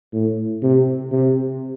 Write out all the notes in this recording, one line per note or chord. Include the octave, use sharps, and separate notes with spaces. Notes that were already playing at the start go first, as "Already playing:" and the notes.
A2
C3
C3